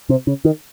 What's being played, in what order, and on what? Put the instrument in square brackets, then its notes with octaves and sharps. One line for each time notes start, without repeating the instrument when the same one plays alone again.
[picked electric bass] C3
C#3
D#3